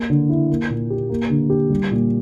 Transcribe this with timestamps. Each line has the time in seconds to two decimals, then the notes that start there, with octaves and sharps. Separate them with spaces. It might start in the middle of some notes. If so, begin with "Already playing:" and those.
Already playing: A#3
0.10 D3
0.29 E4
0.49 A#3
0.70 A#2
0.90 G4
1.09 A#3
1.30 D3
1.50 G4
1.70 G3
1.91 A#2